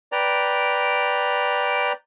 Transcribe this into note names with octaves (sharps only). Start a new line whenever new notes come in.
B4 D5 G5 A#5